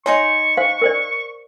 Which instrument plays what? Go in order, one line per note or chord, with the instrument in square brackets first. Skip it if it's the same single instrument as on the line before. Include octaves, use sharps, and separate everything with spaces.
[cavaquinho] D#4 G#5 C6 [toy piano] C#5 [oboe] C#6
[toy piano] C5 F5
A#4 C5 D5